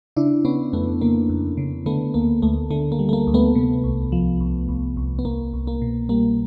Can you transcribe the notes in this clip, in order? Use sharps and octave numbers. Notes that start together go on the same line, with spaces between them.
C#3 D4 E4
C#3 B3 C#4
F2 A3 B3
C#3 A#3
F2
C#3
D3 A3 B3
D2 A#3
D2 A3
D3 A3
A#3
G3
A3
A#3
D2
A3 B3
C3
C2
F3
C2
C2
C2
B3
C2 A#3
C2
A#3
B2
G3 A#3